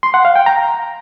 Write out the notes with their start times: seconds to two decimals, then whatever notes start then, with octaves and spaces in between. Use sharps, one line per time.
0.03 C6
0.14 F#5
0.25 F5
0.36 G5
0.46 A#5